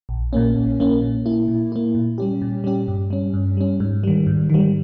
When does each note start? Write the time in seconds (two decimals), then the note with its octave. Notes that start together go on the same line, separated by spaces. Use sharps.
0.09 A#1
0.33 A#2 A#3 C#4
0.56 A#1
0.80 A#2 A#3 C#4
1.02 A#2
1.26 A#3 E4
1.48 A#2
1.72 A#3 E4
1.95 A#2
2.18 G3 C#4 G4
2.42 A#2
2.64 G3 C#4 G4
2.88 G2
3.10 G3 C#4
3.34 G2
3.57 G3 C#4
3.80 G#2
4.03 D#3 G3
4.27 G#2
4.50 D#3 G3